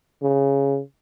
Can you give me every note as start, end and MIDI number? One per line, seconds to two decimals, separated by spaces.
0.22 0.79 49